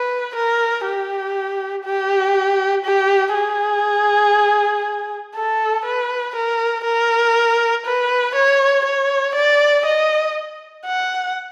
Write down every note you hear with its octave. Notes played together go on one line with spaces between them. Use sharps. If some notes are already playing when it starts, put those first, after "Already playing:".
Already playing: B4
A#4
G4
G4
G4
G#4
A4
B4
A#4
A#4
B4
C#5
C#5
D5
D#5
F#5